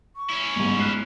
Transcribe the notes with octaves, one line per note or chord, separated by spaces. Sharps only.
C#6
C#4 E4
G1 G#2
F6 F#6 C7